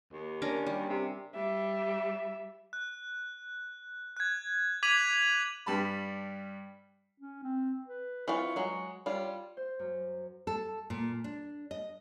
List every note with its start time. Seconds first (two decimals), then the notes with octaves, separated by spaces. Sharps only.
0.12 D#2
0.42 C#4 D4 A#4
0.66 G3
0.89 C3
1.35 G3 E5
2.73 F#6
4.17 F#6 G#6
4.83 D6 G#6 B6 D#7 F7 F#7
5.66 G2 G3 A5 B5
7.20 C#4
7.43 C4
7.86 B4
8.28 E3 C4 F4 C#6
8.56 F#3 G#3
9.06 G3 F4 C#5
9.57 C5
9.79 F#2
10.47 A4
10.90 A#2
11.24 D4
11.71 D#5